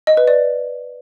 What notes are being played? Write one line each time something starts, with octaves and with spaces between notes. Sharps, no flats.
D#5
B4
D5